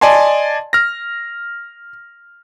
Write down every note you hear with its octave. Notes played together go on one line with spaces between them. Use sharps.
D5 D#5 G#5 A5 C6
F6 A#6